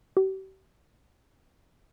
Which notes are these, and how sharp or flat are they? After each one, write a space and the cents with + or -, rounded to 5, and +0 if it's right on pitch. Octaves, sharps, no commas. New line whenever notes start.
G4 -40